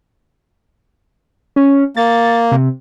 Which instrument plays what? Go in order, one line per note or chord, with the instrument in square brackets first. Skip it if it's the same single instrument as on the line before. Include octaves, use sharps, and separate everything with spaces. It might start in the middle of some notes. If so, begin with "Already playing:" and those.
[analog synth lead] C#4
[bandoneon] A#3 [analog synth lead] A6
[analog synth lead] C3